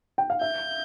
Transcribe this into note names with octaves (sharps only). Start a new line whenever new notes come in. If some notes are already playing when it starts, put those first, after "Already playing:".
G5
F5
E5 G6